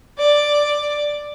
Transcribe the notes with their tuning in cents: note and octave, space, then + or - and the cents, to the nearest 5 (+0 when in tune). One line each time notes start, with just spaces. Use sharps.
D5 +5